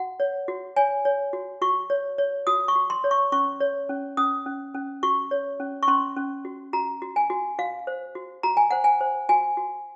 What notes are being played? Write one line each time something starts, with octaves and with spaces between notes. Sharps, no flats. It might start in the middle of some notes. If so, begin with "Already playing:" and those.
Already playing: F#4 F#5
C#5
F#4
C#5 G#5
C#5
F#4
F#4 C#6
C#5
C#5
F#4 D#6
C#6
F#4
C6
C#5
C#6
C#4 C#6
C#5
C#4
C#4 D#6
C#4
C#4
F#4 C#6
C#5
C#4
C#6
C#4 C6
C#4
F#4
F#4 A#5
F#4
G#5
F#4
F#4 F5
C5
F#4
F#4 A#5
G#5
C5 F#5
G#5
C5
F#4 G#5
F#4